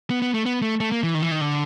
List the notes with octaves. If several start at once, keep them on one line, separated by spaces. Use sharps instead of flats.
B3
B3
A3
B3
A3
A3
A#3
E3
D#3
E3
D#3
D3